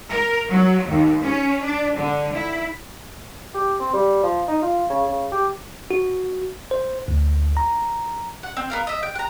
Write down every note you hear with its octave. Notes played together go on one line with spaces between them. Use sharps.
A#4
F#3
D#2
C#4
D4
D3
E4
G4
C4
G3
F3
D#4
F4
C#3
C#3
G4
F#4
C5
D2
A#5
F#5
C4
B3 A#4 F5
D#5 E5
G5
F#5 A#5